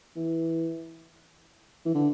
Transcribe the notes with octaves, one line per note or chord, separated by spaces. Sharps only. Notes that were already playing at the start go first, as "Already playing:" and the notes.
E3
E3
D3